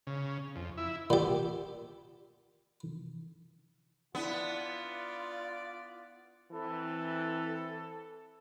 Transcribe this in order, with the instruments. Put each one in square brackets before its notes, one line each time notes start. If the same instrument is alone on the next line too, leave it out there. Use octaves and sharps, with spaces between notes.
[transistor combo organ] C#3
F2
E4
[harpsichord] A#2 G4
[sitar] B3 [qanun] D4 E4 [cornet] F4
[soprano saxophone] D5
[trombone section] E3 C4 [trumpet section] A4